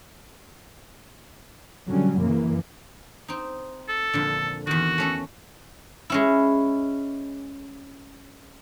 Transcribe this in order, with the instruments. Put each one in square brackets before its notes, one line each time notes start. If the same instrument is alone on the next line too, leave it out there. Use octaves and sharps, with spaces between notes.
[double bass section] D3 F#3 G3 C#4
F#2 C#3 E3 A#3
[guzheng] C4 D#4
[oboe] A4
[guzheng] F2 A#2 D3
[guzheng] E2 D#3 [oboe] F#4
[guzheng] A3 C#4 A4
G#3 C#4 E4